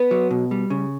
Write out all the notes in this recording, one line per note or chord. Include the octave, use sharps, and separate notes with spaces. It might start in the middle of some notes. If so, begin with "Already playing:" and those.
Already playing: B3 B4
F#3
B2
G3
C#3